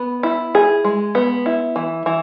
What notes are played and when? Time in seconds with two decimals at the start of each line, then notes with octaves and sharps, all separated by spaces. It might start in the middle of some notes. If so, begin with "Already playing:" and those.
Already playing: B3
0.23 E4
0.55 G#4
0.84 G#3
1.15 B3
1.46 E4
1.76 E3
2.06 E3